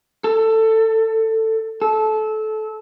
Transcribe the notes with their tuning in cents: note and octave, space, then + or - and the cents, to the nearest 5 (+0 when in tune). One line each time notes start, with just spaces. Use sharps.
A4 +15
A4 -20